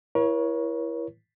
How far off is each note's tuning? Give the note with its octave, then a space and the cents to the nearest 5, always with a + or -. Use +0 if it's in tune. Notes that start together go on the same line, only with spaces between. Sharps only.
E4 +20 A#4 +45 C#5 +0